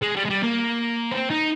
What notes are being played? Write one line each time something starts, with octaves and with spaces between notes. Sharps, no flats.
G#3
G3
G#3
G3
A#3
C4
D#4